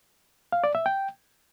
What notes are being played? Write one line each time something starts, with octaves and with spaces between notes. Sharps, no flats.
F5
D5
E5
G5